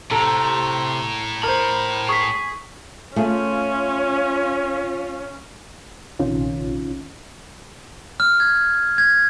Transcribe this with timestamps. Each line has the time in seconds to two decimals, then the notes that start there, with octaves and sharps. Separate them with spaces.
0.11 A2 C3 A4 A#5
1.44 A#4 C5 B5
2.09 G#4 C#6 B6
3.16 A3 C#4 F4 G#4
6.19 A#1 C3 D#3 C#4 F4
8.20 F6
8.40 G#6
8.98 G#6